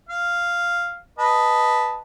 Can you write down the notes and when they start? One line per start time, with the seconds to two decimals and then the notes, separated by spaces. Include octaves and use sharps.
0.09 F5
1.19 B4 D#5 A5